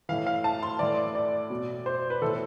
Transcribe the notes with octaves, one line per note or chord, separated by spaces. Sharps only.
A2 E3 F5
F5
A5
C6
A2 E3 D5
D5
B2
C5
B4
A2 E3 A4